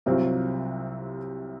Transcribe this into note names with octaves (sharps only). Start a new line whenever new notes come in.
C2 C3 F#3 C4 F4